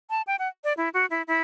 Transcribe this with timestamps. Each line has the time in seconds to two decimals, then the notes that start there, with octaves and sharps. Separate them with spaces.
0.10 A5
0.27 G5
0.39 F#5
0.64 D5
0.77 E4
0.94 F#4
1.10 E4
1.27 E4